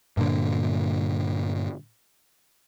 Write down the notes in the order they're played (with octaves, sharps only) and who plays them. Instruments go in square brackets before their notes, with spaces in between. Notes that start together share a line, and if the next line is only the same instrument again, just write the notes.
[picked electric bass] G2 A#2 D3